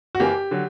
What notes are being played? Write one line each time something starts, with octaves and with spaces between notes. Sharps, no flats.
F#4
F#2 E3 A#3 G4
D3 F#3